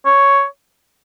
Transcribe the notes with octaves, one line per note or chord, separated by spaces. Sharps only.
C#5